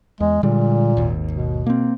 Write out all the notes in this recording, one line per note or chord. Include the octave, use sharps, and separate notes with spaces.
E2 G#3
A#2 D3 G3 G#3
G#1 D#2
B2
A#3 C4